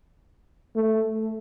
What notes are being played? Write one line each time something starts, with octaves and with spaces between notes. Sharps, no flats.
A3